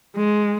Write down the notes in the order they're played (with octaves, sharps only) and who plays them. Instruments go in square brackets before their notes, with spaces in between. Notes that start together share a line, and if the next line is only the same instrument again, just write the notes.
[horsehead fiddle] G#3